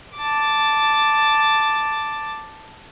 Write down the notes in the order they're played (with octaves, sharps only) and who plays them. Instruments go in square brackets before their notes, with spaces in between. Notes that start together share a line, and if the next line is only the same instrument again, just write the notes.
[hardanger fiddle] A5 D6